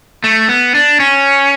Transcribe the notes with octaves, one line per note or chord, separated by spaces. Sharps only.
A3
B3
D4
C#4